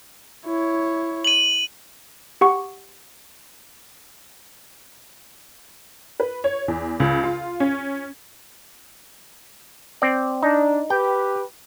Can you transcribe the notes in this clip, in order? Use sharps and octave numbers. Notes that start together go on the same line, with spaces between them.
E4 C#5
D#7 F#7
G4 F#5 C#6
B4
C#5
E2
C#2
F4
C#4
C4 D5
D4 D#4
G4 B4 G5